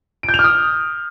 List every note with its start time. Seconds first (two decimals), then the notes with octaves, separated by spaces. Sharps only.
0.23 D7
0.29 G6
0.34 F7
0.39 F6
0.44 D#6